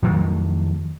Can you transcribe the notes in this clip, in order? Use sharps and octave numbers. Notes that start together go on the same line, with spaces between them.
F2 D#3 F#3 A3